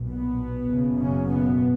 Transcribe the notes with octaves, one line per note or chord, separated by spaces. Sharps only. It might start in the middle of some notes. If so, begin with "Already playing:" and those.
Already playing: B1 A#2
B2 B3
F#1 F#2 C#3
C#3 C#4
B2 B3